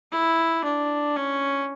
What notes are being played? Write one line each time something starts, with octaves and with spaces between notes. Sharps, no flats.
E4
D4
C#4